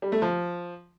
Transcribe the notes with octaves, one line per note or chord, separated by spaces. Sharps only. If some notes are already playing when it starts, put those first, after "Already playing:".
G3
A3
F3